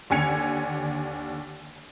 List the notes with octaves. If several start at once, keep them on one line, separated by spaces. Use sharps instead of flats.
D#2 D3 G#5 G#6 C#7 F7